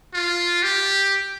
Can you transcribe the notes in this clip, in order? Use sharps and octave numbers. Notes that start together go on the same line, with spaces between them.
F4
G4